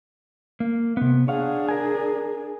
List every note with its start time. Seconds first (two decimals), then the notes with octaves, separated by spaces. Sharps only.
0.60 A#3
0.97 C3 B3
1.28 D4 G#4 C#5 F5 F#5
1.69 A#4 G#5